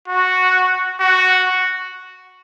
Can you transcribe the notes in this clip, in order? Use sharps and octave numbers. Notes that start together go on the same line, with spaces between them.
F#4
F#4